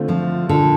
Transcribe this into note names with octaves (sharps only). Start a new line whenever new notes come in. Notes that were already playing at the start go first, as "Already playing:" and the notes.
Already playing: D3 A3 C4 F4
F3
A#2 D3 F3 A#3 D4